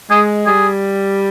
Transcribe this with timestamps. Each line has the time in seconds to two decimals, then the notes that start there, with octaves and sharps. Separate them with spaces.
0.10 G#3 G#4
0.46 G3 G#4